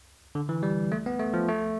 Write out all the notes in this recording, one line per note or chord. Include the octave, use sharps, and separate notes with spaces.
D3
E3
G3
A3
B3
A3
F3
A3